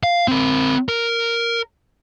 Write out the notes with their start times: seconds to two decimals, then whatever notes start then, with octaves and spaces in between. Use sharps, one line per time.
0.03 F5
0.28 C4 A#4
0.89 A#4